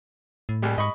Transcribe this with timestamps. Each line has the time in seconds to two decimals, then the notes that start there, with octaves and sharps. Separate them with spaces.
0.49 A2
0.62 C2 G3 G#3
0.78 G#2 D#5 B5 C#6